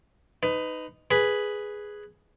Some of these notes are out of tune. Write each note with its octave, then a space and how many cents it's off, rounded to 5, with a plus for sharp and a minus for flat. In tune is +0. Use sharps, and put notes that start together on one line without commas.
D#4 +0 B4 +25
G#4 +0 B4 +0 B5 +0